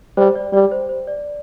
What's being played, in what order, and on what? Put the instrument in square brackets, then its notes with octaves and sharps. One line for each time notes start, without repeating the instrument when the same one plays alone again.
[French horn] G3 [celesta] C5
[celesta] D5
[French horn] G3 [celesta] D5
[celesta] C5
C5
D5